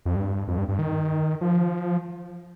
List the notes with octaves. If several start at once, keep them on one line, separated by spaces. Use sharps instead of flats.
F2
G2
F2
G2
G2
D#3
F3